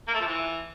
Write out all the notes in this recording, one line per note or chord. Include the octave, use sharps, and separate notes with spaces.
A#3
A3
F3
E3